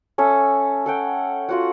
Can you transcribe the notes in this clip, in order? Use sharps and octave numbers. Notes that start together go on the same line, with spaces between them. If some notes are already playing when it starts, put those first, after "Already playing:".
C#4 A4 E5
A4 F#5 G5
F4 F#4 F#5